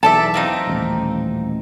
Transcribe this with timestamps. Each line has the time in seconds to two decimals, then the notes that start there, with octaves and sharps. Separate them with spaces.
0.03 B1 E2 A4 D5 E5 A5
0.34 A#3 C4 D#4
0.67 D#1 A1